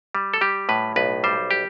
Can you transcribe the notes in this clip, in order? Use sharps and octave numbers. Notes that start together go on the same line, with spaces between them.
G3
A4
G3 G4
A2 B4
B1 B4
G3 C5
G4